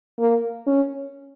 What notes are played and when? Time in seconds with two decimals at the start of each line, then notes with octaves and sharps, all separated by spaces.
0.19 A#3
0.67 C#4